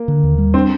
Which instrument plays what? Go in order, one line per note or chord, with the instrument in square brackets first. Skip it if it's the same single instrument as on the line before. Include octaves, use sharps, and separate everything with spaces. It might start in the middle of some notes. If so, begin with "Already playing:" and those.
Already playing: [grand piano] A#3
[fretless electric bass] D3
D#2
G3
[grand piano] C4 [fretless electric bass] D4